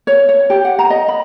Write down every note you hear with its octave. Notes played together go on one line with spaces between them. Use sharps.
C#5
C#5
G4
F#5
A#5
D#5
B5